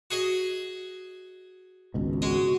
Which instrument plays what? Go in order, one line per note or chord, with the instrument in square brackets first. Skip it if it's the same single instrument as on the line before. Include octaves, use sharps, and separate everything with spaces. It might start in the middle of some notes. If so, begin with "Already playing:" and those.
[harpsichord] F#4 G#4 D#5
[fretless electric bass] G#1 C#2 B2
[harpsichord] G#3 D#5 [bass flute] F#4